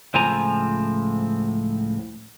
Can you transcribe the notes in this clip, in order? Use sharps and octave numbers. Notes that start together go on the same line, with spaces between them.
C#2 A2 F3 C4 G#5 A#5